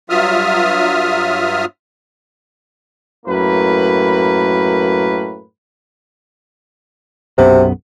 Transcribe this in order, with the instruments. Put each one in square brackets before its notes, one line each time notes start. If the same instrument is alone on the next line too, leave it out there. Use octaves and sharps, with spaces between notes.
[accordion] G2 F#3 F4 E5 D#6 F6
[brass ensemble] F#2 A2 A#3 B4
[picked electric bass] B1 F#2 B3 [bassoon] C3